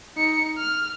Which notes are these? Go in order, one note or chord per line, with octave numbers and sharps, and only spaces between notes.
D#4 C#7
F6